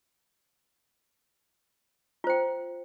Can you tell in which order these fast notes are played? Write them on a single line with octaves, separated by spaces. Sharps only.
F4 C5 G5